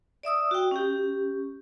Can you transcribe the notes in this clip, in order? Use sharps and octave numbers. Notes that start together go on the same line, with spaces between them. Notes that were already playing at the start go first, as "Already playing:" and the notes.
D5 E5 D#6 E6
F#4 G5
C#4 G4